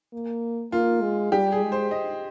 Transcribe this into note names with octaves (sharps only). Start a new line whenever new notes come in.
A#3
A#3 F4
G#3
G3 G4
G#4
G#3
C5
D#5